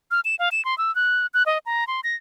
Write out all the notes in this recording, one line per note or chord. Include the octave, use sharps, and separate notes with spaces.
F6
E7
F5
E7
C6
E6
F#6
F#6
D#5
A#5
C6
A#6